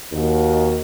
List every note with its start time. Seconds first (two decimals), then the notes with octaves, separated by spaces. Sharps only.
0.12 D#2 D#4 F#4